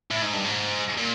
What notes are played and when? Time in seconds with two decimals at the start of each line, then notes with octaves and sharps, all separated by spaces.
0.11 A2
0.22 G#2
0.33 G2
0.44 G#2
0.98 A#2